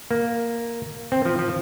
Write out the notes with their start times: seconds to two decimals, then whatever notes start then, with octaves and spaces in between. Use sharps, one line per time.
0.11 A#3
1.12 C4
1.25 F3
1.39 F3